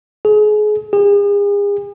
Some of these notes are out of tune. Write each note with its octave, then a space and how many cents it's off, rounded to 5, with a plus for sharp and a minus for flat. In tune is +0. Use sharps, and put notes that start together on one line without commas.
G#4 +30
G#4 -40